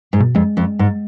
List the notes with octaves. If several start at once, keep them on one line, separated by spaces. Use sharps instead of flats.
G#2
B2
F2 G#3
F2
G#2